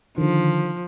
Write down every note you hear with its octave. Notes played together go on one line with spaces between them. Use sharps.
D3 D#3 F3